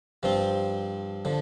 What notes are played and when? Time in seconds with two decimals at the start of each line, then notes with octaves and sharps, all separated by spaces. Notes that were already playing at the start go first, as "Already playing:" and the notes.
0.23 G2 F3 C4 F4
1.25 D3 F3